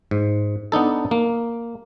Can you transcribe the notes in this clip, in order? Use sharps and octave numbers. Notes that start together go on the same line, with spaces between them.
G#2
B3 D4 D#4 A4
A#3